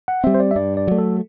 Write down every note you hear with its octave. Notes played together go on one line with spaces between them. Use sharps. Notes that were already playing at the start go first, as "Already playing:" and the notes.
F#5
G3 C4 E5
C5
D5
E5
G2 D5
D5
F#3 A3
A4